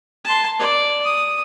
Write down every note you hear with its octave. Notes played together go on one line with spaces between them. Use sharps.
A5 C6
D5
D#6